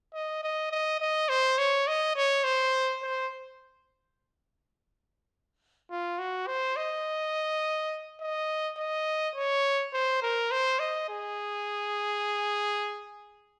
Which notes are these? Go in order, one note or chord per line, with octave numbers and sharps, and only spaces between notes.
D#5
D#5
D#5
D#5
C5
C#5
D#5
C#5
C5
C5
F4
F#4
C5
D#5
D#5
D#5
C#5
C5
A#4
C5
D#5
G#4